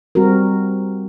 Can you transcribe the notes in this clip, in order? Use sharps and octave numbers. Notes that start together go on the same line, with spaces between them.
G3 C4 F#4 A#4